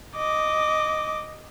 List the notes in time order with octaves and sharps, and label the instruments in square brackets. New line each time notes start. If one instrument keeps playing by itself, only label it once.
[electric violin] D#5 D6